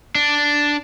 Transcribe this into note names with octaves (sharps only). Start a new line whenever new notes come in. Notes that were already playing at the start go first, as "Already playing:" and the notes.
D4